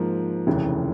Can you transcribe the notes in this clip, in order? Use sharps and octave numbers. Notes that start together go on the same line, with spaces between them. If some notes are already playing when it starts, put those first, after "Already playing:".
Already playing: G#2 F3 A#3
F1 D#2 C#3 E3